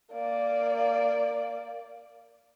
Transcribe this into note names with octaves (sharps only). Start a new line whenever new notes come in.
A#3 D5